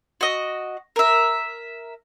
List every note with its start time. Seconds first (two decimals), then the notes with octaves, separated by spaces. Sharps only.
0.21 F#4 D#5
0.96 A#4 E5